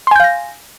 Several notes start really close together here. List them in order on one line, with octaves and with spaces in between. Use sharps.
C6 G#5 G6 F5 A#6